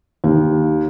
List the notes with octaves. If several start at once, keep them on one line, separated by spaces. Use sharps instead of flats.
D#2